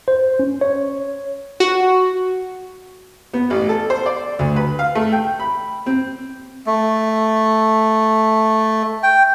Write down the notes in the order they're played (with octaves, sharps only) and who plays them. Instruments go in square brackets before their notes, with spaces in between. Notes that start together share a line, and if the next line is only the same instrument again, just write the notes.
[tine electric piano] C5
C#4
C#5
[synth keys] F#4
[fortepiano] B3
A1
A4
C5
D5
D2
B4
F5
A3
G5
B5
C4
[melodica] A3
G5